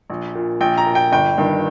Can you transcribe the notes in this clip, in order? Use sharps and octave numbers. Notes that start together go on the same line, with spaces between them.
A#1
A#2
A#1 G5
A#5
A#2
G5
G1 G5
G2 D#3